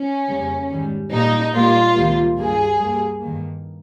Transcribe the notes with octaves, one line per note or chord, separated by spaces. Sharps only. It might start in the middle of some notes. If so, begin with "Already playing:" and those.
Already playing: C#4
F2 C#3 G3 A#3
G#2 D#3 G3
A#2 G3 A#3 D#4
A#2 G3 A#3 F4
C#2 C3 D#3 G3 A#3
G2 G3 A#3 G#4
G2 G3 A#3
G2 D#3 A#3